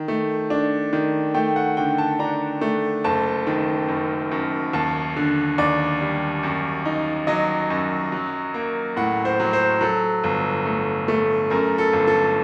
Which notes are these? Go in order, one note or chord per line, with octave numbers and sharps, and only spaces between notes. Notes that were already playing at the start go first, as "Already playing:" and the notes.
Already playing: D#3
A3
D4
D#3
A3 G5
F#5
D3 G5
A5
D4 A#5
A3
F#1 A5
D#3
F#2
F#2
D#2 A5
D3
D#2 D5
G3
F#2
D#4
F#3 D#5
F#2
F#3
A#3
A2 F#5
C5
F#3
C5
F#3 A4
G1
A3
A3
F#2 A#4
A4
G1
A4